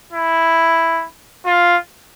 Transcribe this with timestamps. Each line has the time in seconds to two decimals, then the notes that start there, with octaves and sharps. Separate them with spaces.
0.13 E4
1.46 F4